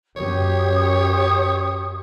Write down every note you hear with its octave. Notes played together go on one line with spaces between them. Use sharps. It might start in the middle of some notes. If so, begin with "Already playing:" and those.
F#2 C#4 G4 C#5 D#6